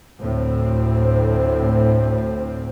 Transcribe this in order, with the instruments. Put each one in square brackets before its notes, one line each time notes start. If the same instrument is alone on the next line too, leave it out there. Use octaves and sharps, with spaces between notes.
[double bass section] D2 A2 C4